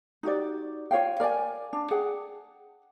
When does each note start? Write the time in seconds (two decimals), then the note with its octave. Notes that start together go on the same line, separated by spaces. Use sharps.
0.23 D#4 F#4 G4 D5
0.91 F4 C#5 F5 G5
1.20 A#4 D5 G5 G#5
1.73 D4
1.91 G#4 F#5 G5